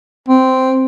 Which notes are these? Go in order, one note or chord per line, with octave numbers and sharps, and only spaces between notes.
C4